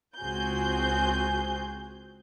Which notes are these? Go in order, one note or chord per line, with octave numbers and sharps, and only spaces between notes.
C#2 C4 F#4 G#4 G#5 G6